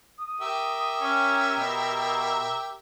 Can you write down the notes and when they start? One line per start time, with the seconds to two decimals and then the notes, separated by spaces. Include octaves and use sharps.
0.19 D#6
0.41 G4 A#4 E5
1.01 C#4
1.58 B2